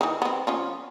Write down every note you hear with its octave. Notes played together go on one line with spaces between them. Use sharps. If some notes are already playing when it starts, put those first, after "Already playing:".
D#3 E3
B3 C4
F3 C#4 F4